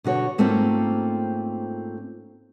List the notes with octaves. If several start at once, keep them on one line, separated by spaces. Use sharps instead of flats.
B2 D3 F#4 C#5
G#2 A3 A#3 C4 C#4 F4